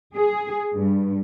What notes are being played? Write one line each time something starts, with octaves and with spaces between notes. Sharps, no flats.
G#4
G2